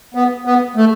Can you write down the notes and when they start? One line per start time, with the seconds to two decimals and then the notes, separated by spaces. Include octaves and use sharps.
0.15 B3
0.45 B3
0.76 A3